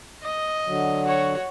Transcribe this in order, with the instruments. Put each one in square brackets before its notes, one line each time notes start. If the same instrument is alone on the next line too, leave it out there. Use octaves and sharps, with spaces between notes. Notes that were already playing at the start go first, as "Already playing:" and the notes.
[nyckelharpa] D#5
[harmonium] D3 F#3
[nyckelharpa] F#4 C#5